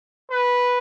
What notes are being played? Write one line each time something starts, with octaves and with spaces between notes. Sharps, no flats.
B4